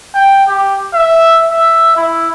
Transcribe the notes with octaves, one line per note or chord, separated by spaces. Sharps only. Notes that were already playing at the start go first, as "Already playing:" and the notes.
G5
G4
E5
E5
E4